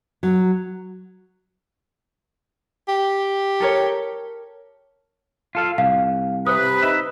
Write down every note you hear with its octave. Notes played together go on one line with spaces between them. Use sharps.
F#3
G4
A4 A#4 C#5
F4 A4 F5
C2 F5
C3 B4 D#6
D#4 E5